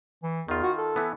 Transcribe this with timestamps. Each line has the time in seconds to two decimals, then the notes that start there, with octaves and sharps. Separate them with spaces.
0.23 E3
0.48 E2 D#3 F4
0.63 F#4
0.78 A4
0.96 E3 B3